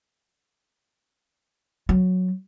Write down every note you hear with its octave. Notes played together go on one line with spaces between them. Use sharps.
F#3